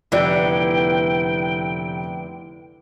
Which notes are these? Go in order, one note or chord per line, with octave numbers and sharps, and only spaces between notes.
F1 D3 E3 B3 F4 D5 E5 G5